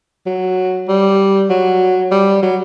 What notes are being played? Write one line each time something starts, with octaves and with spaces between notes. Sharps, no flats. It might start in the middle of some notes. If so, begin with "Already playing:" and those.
F#3
G3
F#3
G3
F#3